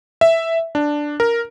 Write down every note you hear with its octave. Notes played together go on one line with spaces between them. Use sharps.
E5
D4
A#4